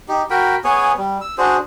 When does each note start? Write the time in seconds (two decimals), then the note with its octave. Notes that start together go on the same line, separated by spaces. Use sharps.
0.09 D#4 G4
0.30 F#4 A#4 G5 B5
0.64 B3 G#4 C#5 G#5
0.97 G3
1.21 E6
1.38 D4 F#4 G#4 C5